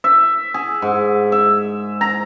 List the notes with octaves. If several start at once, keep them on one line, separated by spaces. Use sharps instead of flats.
E5
G#4
G#2
E5
A#5